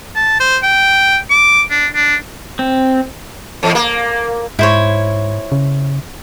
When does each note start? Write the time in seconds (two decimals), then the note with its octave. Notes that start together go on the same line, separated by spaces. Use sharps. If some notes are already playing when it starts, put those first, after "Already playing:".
0.16 A5
0.40 C5
0.63 G5
1.31 D6
1.70 D4
1.95 D4
2.59 C4
3.63 E2
3.75 A#3
4.59 G#2 E4 C5 C#5
5.52 C#3